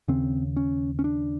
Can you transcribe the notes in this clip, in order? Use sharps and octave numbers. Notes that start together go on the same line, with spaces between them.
D#2 C#3 C4
C#4
C#4
D4